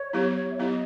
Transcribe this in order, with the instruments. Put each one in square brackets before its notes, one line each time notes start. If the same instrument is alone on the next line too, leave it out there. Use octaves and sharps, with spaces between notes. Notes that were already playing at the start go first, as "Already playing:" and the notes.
Already playing: [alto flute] C#5
[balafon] F#3 B3 E4 G4
[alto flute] E5
[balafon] F#3 B3 E4 G4 [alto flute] D#5